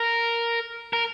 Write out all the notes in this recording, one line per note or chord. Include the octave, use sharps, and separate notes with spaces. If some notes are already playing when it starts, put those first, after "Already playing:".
Already playing: A#4
A#4